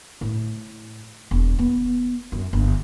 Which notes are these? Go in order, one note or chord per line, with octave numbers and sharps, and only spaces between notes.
A2
E1
B3
F#2
G1